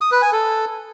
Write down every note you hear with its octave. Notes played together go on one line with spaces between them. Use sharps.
D#6
B4
G#5
A4